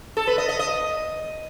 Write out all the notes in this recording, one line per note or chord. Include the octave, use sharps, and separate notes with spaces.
A4
B4
D#5
D#5
D#5